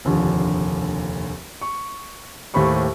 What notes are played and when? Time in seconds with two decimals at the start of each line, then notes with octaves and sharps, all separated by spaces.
0.05 F1 A#1 D#2 D3
1.61 C#6
2.54 D#2 A2 G4 C5 B5 C#6